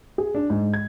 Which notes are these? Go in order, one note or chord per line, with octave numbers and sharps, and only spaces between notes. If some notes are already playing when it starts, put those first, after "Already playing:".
G#4
D4
G#2
G#6